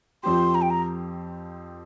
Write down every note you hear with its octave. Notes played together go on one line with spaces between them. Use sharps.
F2 F3 C4 G4 C6
A#5
G5
A#5